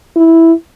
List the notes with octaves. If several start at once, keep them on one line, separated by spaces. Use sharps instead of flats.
E4